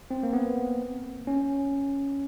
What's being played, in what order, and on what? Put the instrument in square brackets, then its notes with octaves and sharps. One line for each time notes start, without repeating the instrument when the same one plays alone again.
[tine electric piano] C4
A#3
B3
C#4